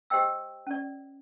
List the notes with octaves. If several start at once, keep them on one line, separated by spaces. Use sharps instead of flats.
G4 C5 D#5 G5 E6
C#4 D5